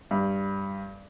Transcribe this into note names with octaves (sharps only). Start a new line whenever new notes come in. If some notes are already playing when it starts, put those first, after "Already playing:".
G2